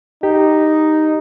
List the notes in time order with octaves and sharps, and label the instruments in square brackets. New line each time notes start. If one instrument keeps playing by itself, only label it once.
[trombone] D#4 [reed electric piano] G4